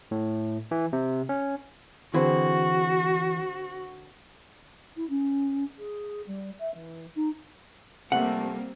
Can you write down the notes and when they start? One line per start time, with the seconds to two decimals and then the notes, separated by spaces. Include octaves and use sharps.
0.11 A2
0.71 E3
0.93 C3
1.29 C#4
2.14 D3 E3 C4 F#4 G#4
4.96 E4
5.09 C#4
5.78 G#4
6.26 G3
6.59 E5
6.74 E3
7.15 D#4
8.12 C3 F3 G3 A3 A#3 C4 F#5